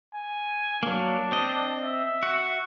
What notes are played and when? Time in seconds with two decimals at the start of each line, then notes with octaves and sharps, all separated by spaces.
0.14 G#5
0.83 F#3 A#3 D4
1.32 C4 D#5
1.83 E5
2.23 F#4